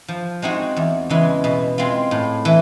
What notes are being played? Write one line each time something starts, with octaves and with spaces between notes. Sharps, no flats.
F3
G#3 C4 D#4 F#4
E2
C#3 E3 G#3
B2
G#3 C4 F4
A2
E3